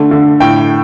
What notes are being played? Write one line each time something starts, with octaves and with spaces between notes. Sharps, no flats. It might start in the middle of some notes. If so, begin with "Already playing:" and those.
Already playing: D3 A3
D3
A2 G5